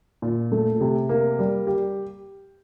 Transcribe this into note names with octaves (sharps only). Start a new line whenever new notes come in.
A#2
A3
C3
A#3
G3
G4